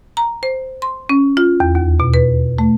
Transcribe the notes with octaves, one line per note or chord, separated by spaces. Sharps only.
A#5
C5
C6
C#4
F4
E2
D#2
B2
B4
A3